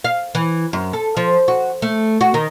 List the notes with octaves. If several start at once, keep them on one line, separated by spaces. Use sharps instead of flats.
F5
E3
F#2
A4
F3
F#4
A3
F#4
D#3